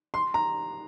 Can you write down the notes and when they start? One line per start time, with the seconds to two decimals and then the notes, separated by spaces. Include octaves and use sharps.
0.14 C6
0.34 A#5